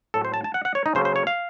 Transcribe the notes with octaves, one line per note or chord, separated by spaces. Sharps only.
A2 F#3 C4 A4
C5
A5
A5
F#5
F#5
C#5
D#4
C#3 F#3 A#3 C#4 C5
C5
C#5
F5